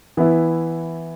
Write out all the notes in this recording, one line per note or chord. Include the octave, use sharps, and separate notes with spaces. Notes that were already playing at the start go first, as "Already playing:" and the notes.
E3 B3 E4